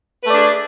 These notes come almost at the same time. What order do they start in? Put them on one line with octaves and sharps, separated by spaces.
B4 A3 D5 D4 G#4